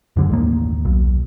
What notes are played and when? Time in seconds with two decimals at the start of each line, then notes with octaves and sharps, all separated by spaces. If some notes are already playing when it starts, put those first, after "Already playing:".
0.16 F#2 D3 G3 G#3
0.29 A1 D#2 A#3
0.85 B1